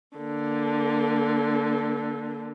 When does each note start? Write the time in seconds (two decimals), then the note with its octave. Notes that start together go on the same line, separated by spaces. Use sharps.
0.17 D3 A#3